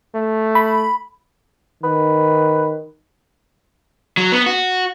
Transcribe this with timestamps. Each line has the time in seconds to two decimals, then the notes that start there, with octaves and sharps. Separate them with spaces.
0.15 A3
0.55 B5
1.83 D#3 B4
4.17 F#3
4.32 B3
4.47 F#4